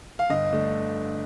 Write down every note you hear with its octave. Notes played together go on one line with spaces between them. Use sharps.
F5
G1 D#5
D3 A3